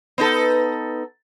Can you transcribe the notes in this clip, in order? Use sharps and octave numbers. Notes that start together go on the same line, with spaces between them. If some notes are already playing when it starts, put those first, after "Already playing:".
B3 D#4 A4